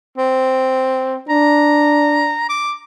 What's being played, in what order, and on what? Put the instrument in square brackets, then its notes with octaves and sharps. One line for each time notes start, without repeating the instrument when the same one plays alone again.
[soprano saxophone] C4
[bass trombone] D4 [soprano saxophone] A#5
[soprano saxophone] D6